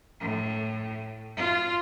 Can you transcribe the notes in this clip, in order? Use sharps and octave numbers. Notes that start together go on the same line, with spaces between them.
A2
F4